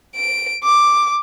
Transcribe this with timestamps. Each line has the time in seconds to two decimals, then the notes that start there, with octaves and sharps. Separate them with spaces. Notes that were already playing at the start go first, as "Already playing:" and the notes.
0.16 D7
0.64 D6